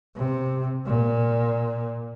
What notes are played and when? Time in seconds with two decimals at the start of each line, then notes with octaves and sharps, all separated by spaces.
0.16 C3
0.86 A#2